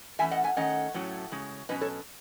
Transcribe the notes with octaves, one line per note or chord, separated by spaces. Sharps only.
A2 E3 A3 C#4 E5 G#5
D#5 F#5
E5 G#5
D#3 A3 C#4 D#5 F#5
A2 F#3 A3 C#4
C#3 G#3 C#4
B2 F#3 C#4 B4 D#5
A4 C#5